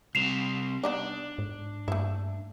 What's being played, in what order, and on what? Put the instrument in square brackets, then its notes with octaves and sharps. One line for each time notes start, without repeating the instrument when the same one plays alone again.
[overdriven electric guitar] C2 C4 [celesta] C7 E7 F7
[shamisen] B3 D#4 D5 [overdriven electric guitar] D4
[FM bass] G#2
[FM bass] G2 [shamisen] A3 A#3 E4